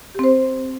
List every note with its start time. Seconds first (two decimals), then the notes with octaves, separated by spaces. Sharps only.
0.15 G4
0.19 C4
0.24 C5